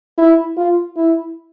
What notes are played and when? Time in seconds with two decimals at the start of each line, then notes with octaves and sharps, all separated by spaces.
0.18 E4
0.57 F4
0.97 E4